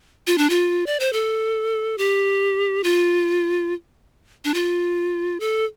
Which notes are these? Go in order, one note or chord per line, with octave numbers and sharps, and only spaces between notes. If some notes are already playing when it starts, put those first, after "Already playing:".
F4
D4
F4
D5
C5
A4
G4
F4
D4
F4
A4